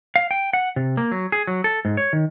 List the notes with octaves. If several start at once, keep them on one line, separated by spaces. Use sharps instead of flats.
F5
G5
F#5
C3
A#3
F#3
G#4
F#3
A4
G#2
C#5
D#3